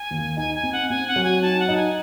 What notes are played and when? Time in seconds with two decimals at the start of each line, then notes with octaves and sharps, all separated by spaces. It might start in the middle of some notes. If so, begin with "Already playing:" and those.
Already playing: G#5
0.11 D#2
0.37 D#4 G#5
0.55 G#5
0.63 C4
0.72 F#5
0.90 C4 G#5
1.08 F#5
1.16 F#3
1.24 G#5
1.42 D#4 A5
1.60 F#5
1.68 D#4
1.77 G#5